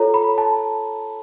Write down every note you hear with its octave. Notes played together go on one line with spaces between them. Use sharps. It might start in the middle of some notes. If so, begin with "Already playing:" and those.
Already playing: F4 A4 C#5 A#5
B5
A5